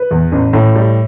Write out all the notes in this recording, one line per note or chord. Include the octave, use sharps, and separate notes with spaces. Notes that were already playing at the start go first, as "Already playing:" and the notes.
Already playing: B4
E2
A1
A2
G3